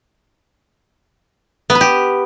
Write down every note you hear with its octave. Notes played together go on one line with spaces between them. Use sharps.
B3
B4
G4